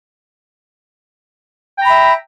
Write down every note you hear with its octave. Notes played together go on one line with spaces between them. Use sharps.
E5 G5 A#5 B5